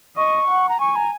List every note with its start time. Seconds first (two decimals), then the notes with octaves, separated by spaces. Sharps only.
0.17 D#5 C#6
0.48 F#5
0.69 A#5
0.80 G#5 C#6
0.96 A#5